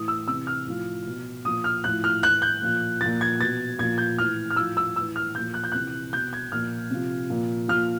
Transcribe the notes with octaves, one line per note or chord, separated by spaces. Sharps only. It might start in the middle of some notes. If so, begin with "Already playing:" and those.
Already playing: A2 E3 D#6
E6
C3 E3 E6
F6
A2 F3
B2
A#2 F3 D#6
F6
A2 F3 F#6
F6
A2 E3 F#6
G6
A#2 F3
A#2 F3 A6
G#6
B2 A6
A#2 F3 G#6
G6
A2 E3 F6
F6
A2 F3 E6
E6
A2 E3 E6
F6
A#2 F3 G6
F#6
G6
C3 E3 F#6
B2 G6
G#6
A#2 F3 F6
C3 F3
A#2 F3
A#2 F3 F6